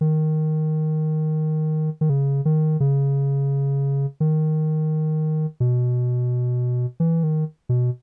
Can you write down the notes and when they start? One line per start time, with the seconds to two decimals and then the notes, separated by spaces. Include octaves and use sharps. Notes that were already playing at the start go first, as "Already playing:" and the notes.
0.01 D#3
2.01 D#3
2.10 C#3
2.45 D#3
2.80 C#3
4.20 D#3
5.60 B2
7.00 E3
7.23 D#3
7.69 B2